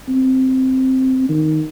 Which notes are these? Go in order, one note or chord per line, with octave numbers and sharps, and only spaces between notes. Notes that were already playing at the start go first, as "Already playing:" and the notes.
C4
D#3